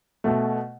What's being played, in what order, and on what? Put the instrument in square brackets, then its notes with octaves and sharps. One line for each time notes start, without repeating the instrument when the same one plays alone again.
[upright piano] B2 A3